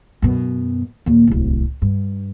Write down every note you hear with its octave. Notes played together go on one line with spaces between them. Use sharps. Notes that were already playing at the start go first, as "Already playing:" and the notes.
F#2 B2
D#2 A#2
D1 C2
G2